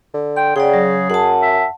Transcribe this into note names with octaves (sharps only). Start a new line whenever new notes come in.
D3
G5 C6
C#3 G#4 D5 F#5 G5
F#3
F#2 F#5 A5
E5